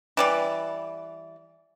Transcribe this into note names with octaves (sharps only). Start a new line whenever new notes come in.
E3 G3 D5